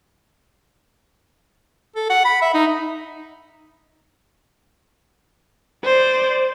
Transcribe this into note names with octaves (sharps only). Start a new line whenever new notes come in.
A4
F#5
B5
E5
D#4
C5 D5